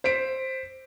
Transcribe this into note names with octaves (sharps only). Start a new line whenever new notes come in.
C5 B6 D7